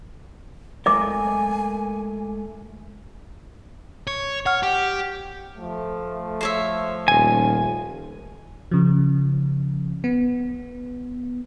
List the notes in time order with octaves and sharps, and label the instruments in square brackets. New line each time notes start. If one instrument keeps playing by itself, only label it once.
[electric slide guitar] G#3 A3 A#4 [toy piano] D#5 D6 [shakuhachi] G#5
[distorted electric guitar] C#5
[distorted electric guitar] C#5 [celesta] F#5 F6
[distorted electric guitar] G4
[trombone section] F3 A3
[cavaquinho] C5 C#5 E5
[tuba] D#1 [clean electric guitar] G#5
[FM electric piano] C#3 F3
B3